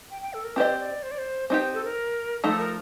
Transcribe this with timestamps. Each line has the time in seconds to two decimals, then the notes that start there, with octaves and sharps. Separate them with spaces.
0.11 G5
0.22 G5
0.34 A4
0.45 A#4
0.56 C4 G4 C5 D5 D#5
0.80 D5
1.03 C5
1.11 D5
1.18 C5
1.49 C4 D#4 G4 C5
1.74 A4
1.84 A#4
2.43 F3 A3 D#4 A4
2.59 A#4